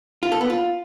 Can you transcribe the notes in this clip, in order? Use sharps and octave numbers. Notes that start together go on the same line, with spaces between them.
F4
A4
B3
F4